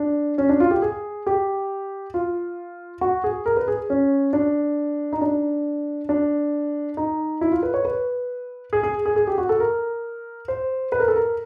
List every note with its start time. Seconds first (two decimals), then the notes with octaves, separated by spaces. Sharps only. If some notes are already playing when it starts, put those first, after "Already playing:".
Already playing: D4
0.38 C#4
0.49 D4
0.60 F4
0.71 G4
0.82 G#4
1.27 G4
2.14 F4
3.01 F#4
3.24 G#4
3.46 A#4
3.57 B4
3.68 G#4
3.90 C#4
4.33 D4
5.13 D#4
5.21 D4
6.09 D4
6.97 D#4
7.41 E4
7.52 F4
7.63 B4
7.74 C#5
7.85 B4
8.73 G#4
8.83 G#4
9.06 G#4
9.16 G#4
9.27 G4
9.38 F#4
9.49 A4
9.60 A#4
10.48 C5
10.92 B4
11.00 A#4
11.08 A4
11.16 A#4